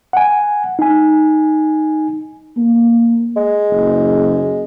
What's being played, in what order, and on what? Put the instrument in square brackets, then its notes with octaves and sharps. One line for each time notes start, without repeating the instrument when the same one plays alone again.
[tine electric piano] F#5 G#5
D#4 G#5
[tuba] A#3
[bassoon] G#3
[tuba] F#1